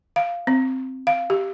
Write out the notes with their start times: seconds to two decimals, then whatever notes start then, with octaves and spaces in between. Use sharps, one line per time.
0.16 F5
0.47 C4
1.07 F5
1.30 G4